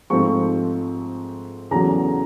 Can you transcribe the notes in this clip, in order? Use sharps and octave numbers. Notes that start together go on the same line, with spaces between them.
G#2 F3 A3 C4 C#6
E2 C#3 F#3 A3 A#5